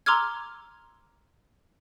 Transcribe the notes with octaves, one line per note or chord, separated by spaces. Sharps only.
A#5 C6 D6 E6 F6 G#6